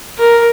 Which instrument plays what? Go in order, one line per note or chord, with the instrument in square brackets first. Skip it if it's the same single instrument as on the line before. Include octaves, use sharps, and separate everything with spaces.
[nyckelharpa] A#4